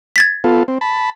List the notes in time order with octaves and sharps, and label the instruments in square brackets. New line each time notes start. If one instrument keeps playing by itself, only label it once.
[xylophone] G#6 A6 B6
[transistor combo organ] B3 F4 A4
C4
A5 B5